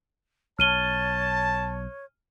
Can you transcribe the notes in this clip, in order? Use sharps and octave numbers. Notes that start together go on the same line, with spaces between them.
B1 C#5 A5 F6 D#7 G7